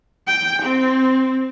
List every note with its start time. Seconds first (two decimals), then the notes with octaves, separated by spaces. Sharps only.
0.27 G5
0.62 C4